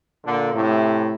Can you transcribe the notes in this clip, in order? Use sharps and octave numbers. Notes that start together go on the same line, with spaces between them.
A#2 D3
A2 C3